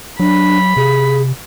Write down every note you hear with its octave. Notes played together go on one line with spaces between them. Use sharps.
F#3 D4 B5
C3 G#4